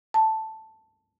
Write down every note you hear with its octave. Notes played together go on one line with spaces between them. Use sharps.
A5